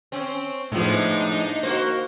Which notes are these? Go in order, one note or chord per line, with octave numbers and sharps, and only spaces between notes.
C4 C#4
A2 F3 G#3 B3 D4 D#4
A#3 F#4 C5